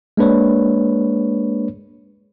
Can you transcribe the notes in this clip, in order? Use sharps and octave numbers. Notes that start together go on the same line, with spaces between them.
G#3 A#3 D4 B4 C#5